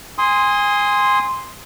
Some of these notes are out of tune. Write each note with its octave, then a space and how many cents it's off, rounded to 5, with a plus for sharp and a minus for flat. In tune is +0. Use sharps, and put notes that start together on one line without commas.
G#5 -25 C6 +0 D#6 +15